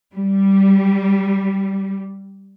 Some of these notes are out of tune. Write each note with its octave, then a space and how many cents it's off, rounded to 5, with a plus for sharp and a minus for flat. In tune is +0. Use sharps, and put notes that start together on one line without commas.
G3 -10